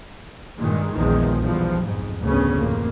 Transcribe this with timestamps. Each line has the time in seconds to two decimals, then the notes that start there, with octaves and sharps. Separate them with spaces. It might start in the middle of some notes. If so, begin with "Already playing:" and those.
0.58 G2 A#2 D#3 G#3
0.94 A#1 E2 D#3 F3 G#3
1.39 B1 E2 F3 G3
1.83 F2 G#2
2.20 A1 D2 G2 C#3 B3 C#4
2.55 A1 F2 A#3